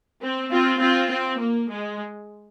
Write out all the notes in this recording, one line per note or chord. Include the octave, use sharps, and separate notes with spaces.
C4
C4 F4
C4 F4
C4
A#3
G#3